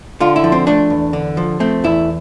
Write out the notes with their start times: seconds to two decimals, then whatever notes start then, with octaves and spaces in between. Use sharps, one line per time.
0.20 D3 F4
0.36 E4
0.44 F3
0.52 C4
0.67 A3 D4
0.90 E2
1.13 D3
1.37 F3
1.60 A3 C4
1.84 E2 E4